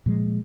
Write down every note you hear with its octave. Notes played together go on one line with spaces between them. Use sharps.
A#2 F3 G#3